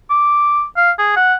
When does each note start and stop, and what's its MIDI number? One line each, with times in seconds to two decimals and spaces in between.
0.10 0.64 86
0.77 0.91 77
0.99 1.13 68
1.17 1.34 78